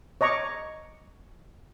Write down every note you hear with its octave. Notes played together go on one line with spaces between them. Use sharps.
C#5 D#5 A#5 C#6 D6